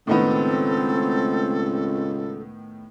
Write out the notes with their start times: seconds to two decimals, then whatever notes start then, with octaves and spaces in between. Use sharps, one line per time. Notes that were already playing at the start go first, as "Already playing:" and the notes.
0.07 C#2 A2 D#3 B3 C4 A4